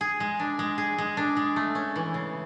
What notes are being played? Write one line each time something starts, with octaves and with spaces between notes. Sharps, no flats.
G#4
G#3
D4
G#3
G#4
G#3
D4
G#3
A3
C#4
E3
C#3